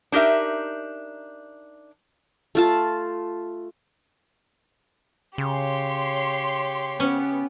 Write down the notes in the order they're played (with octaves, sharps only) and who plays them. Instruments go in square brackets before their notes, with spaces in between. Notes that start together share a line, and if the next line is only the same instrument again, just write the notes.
[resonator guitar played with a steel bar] D4 D#4 G4 A#4 E5
[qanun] A3 F4 A5
[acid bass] C#3 [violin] G4 C#5 [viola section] C6
[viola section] B3 [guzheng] C#4